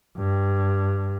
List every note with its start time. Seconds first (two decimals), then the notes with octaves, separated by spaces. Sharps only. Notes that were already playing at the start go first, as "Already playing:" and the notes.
0.17 G2